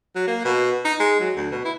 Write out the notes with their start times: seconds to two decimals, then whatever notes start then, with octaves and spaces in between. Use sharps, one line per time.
0.16 F#3
0.27 A#3
0.45 B2
0.85 D#4
1.00 G#3
1.21 F#3
1.36 D2
1.51 B2
1.65 E4